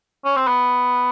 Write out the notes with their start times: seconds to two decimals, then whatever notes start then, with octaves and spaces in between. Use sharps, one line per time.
0.25 C#4
0.36 C4
0.47 B3